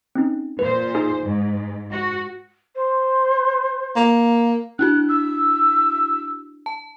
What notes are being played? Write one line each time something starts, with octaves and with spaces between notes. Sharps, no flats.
C4 C#4 D#4
A#2 B4 C5
D#4 G#4 G#5
G#2
F#4
C5
A#3
D4 E4 F#4 F#6
E6
A5